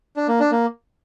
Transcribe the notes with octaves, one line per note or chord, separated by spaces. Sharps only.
D4
A#3
D4
A#3